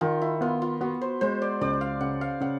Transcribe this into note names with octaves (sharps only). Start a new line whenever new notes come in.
D#3 F4
E4
B3 F4
F4
B3 F#4
C5
G#3 C5
D5
C#2 D5
F5
C#3 F#5
F5
C#3 F#5